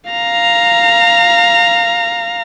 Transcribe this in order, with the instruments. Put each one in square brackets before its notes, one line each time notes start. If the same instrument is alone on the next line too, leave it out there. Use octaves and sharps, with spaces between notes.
[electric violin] F5 A#5